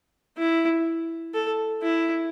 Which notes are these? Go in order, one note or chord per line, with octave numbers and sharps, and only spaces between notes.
E4
A4
E4